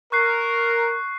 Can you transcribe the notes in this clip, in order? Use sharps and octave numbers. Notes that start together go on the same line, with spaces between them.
A#4 C#6 F#6 C7